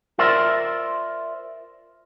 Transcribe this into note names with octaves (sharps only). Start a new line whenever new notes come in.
F4 A#4 C5 D5 E5